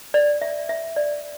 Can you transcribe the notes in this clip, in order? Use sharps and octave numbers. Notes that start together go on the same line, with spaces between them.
D5
E5
E5
D5